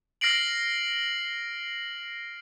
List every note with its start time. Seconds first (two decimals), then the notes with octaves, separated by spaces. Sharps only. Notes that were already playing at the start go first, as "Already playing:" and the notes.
0.21 F6 A#6 C7 D7 F#7